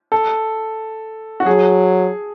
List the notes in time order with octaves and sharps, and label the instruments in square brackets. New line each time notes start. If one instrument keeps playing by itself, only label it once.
[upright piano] A4
F#4
[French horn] F#3 [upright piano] G#4